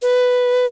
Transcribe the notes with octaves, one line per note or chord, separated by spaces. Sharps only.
B4